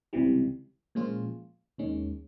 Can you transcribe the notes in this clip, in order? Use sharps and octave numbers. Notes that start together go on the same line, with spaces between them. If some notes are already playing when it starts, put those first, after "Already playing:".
C#2 C3 E3 G3
A#2 F3 G#3 C#4 F4
D#2 D#3 G#3 C#4